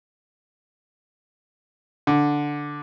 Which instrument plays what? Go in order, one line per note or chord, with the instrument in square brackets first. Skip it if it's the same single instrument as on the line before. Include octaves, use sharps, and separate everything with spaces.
[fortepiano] D3